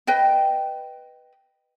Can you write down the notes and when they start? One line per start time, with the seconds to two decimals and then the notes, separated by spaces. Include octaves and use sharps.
0.07 B4 D#5 G5